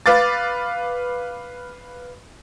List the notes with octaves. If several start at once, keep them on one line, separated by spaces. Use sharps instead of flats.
B4 F5 D6 A6